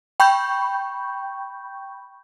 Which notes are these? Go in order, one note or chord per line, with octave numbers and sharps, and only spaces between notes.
G5 B5 C#6 G6